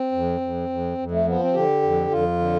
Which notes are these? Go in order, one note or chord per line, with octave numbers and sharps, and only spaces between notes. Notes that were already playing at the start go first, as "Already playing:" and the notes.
Already playing: C4
F2
F2
F2
F2
A3
F3 B3
C4
D3 G4
F2
F2 F4
D3